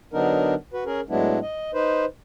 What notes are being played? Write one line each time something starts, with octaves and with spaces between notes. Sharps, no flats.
D3 F#3 B3 D4 D#4 A#4
F#4 B4
C#4 G#4 A#4
A2 F#3 G#3 B3 D4 E4
D#5
D#4 B4 C5